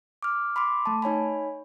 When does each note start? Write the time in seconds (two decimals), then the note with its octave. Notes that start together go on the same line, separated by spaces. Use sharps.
0.23 D6 F6
0.56 B5 C6 D6
0.86 A3 A5
1.02 D#4 C#5 G#5 B5